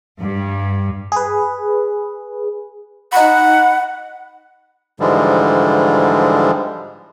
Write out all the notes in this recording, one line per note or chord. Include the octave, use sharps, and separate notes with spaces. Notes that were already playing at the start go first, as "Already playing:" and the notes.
G2
G#4 B4
D#4 F#5 B5
G#2 D3 E3 F3 G3 G#3